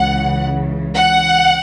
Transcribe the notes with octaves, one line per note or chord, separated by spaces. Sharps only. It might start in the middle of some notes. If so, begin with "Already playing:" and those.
Already playing: C#2 C#3 E3 F#5
F#5